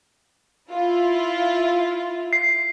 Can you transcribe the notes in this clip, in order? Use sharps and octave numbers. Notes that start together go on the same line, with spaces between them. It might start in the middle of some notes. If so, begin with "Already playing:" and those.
E4 F4
C7